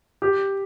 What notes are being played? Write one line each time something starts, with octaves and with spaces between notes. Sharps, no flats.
G4